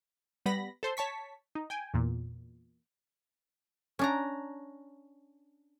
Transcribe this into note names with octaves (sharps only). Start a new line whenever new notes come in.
G3 B3 B5 A#6
A4 C5 C6
C#5 A5 C#6 B6
D#4
G5 G#5
E2 A#2
C#4 D4 A#5